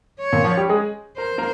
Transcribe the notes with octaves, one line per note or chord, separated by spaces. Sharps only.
C#5
A#2 A#3
F3 F4
G3 G4
G#3 G#4
A#4 C5
A#3 A#4